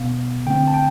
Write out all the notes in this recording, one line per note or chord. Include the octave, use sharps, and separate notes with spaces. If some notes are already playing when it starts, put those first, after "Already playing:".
Already playing: B2 B3 F5
D3 A3 C4 G5
A5
G5